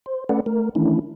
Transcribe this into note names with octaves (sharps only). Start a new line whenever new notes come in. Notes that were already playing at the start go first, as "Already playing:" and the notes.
C5
A3 C#4 A4 B4 D5 F#5
A3 A#4
D#3 E3 A3 C#4 D4 E4